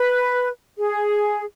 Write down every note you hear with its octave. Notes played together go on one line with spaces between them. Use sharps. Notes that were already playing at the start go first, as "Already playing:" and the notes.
Already playing: B4
G#4